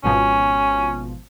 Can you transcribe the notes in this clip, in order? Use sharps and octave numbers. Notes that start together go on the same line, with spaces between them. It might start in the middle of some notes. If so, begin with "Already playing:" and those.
G#1 B2 F3 C#4